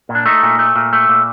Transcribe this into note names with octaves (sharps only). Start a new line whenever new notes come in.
A#2
D4
A3 D#4
A#2
A3
A#2
A3
A#2